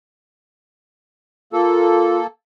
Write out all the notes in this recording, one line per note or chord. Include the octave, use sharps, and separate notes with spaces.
A#3 F4 A4